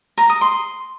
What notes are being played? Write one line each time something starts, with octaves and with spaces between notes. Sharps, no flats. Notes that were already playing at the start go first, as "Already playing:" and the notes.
A#5
D#6
C6